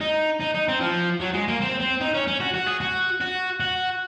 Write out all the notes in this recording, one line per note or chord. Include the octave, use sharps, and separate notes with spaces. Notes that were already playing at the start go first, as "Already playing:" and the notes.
D#4
D#4
D#4
C4
F3
F#3
G#3
A#3
C4
C4
D#4
C#4
C#4
F#4
F#4
G#4
F#4
F#4
F#4